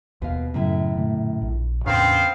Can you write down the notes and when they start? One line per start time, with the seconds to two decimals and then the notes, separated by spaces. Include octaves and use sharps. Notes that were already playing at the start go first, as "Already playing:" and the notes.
0.22 D#2 B2 F5
0.54 F#2 A2 C#3 E4
0.97 A#2 D3 A3
1.42 A#1
1.86 E2 A2 C#3 B3 C4 D4 A#4 F5